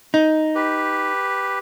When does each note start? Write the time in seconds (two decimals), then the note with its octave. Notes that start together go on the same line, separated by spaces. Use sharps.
0.14 D#4
0.55 G4 B4